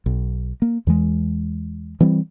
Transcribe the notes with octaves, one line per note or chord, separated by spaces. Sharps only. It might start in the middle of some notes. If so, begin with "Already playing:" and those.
B1
A#3
E2 E3 G#3
E3 G3 C4